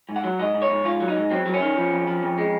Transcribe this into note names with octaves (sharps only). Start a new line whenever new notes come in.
G#2
F#5
F#3
G#2 D#5
G#2
C#5
G#2
G#2 F4
F#3
D#4
G#2
F#3 C4
F#3
C#4
D#3
F3
F2
F3
F2
G#3